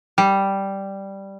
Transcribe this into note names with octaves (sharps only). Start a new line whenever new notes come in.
G3